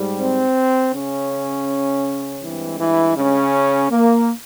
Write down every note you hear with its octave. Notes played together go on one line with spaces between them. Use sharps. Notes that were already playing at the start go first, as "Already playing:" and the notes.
Already playing: G#2 G3
C4
C#3 C#4
G2 E3 G#3 C4
E3 E4
C#3 C#4
A#3